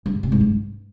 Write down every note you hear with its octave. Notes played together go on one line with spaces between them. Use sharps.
G2
B3
C3
G#2
G2